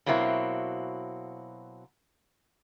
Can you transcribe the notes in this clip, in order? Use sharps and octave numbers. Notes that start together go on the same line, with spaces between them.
B2 F#3 A#3 C4 E4